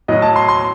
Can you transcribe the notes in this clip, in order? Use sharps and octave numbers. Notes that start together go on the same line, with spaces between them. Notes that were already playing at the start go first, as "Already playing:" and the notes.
A2 F#3 D#5
A5
C6
C6